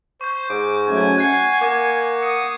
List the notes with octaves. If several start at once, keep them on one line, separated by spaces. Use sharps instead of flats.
C5 C#6 G6
G#2 D6
F#3 A3 C#4 G#5
F#5 F#6 G#6 C7
A#3 G#5 D6
D#6 C#7